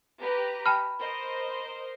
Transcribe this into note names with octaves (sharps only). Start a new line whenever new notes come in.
G4 B4 A#5
G5 A5 B5 F6
A#4 C5 D#5